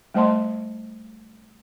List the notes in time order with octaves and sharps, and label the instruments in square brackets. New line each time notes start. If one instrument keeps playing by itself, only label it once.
[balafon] G3 A3 C5 D#5 A5 C6